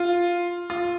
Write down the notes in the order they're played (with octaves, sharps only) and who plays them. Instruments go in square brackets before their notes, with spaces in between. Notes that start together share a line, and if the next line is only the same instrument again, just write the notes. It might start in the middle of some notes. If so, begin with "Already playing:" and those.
Already playing: [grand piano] F4
F4